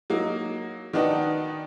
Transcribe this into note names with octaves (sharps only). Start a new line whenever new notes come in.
F#3 A#3 D#4
D#3 B3 D4 D#4 F#4